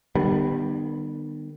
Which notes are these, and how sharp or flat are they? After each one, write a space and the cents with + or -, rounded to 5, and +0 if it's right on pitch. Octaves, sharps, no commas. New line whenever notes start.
D#3 -45 G3 +0 B3 -5